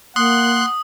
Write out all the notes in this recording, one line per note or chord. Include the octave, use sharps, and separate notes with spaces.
A#3 F#5 C6 D#6 F#6